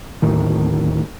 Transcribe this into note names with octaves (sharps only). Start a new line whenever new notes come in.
D1 D#2 A2 D#3